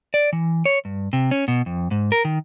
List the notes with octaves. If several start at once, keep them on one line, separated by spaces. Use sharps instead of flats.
D5
E3
C#5
G2
C3
C#4
B2
F2
G#2
A#4
D#3